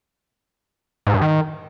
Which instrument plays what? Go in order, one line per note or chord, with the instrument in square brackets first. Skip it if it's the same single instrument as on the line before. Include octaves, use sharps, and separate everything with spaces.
[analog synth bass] G#2
G2
D#3